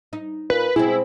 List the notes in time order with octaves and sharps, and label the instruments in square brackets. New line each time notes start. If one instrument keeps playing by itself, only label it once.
[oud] D#4
[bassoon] A#2 [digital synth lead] B4
[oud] B2 G#3 C4 [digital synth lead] E4 [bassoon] G#4